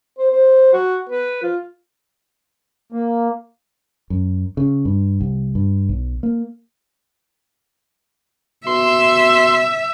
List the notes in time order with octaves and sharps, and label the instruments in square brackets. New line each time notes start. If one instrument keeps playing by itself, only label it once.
[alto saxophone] C5
C5
F#4
B4
F4
[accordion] A#3
[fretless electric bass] F#2
C#3
G2
C2
G2
B1
A#3
[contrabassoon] B2 [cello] E5 [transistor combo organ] C6